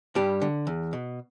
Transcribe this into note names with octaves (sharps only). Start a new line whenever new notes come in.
G2 G3 G4
D3
E2
B2